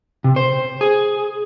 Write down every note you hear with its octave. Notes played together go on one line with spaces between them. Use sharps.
C3
C5
G#4